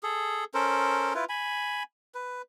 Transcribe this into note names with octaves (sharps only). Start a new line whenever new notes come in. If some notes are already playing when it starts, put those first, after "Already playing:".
G#4 A4
C#4 A4 A#4 C5
E4 F4 B4
G#5 B5
B4